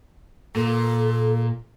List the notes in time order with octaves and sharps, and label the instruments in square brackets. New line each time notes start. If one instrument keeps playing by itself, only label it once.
[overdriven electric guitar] A#2 [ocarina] A4